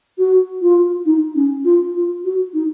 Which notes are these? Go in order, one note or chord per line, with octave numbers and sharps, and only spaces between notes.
F#4
F4
D#4
C#4
F4
F4
F#4
D#4